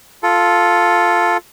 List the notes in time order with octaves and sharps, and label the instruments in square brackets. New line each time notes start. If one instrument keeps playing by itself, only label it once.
[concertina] F4 A4